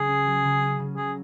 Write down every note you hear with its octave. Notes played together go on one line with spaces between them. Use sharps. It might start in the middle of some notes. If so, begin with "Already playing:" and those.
Already playing: C#3 F#3 G#4
C#4
F#3
C#3
C#4
C#3
F#3 G#4